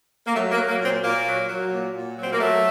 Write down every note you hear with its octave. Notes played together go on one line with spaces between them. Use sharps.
A#3
F#3 A3
A#3
F#3
A#3
A#2
C4
A#2 A#3
F#3
F#3
A#2
A#2
F#3
C4
A#3
F#3 A3